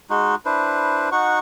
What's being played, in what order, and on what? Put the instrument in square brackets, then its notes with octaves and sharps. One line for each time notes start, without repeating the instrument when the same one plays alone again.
[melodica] G#3 D#4 F#4
D4 E4 B4 C5
D#4 F#4 F#5 C#6